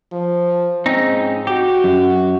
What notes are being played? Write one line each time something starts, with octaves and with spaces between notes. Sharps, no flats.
F3
G#2 C4 C#4 D#4
F#4 G4
F#2